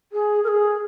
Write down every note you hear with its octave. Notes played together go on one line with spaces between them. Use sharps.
G#4
A#4
G#4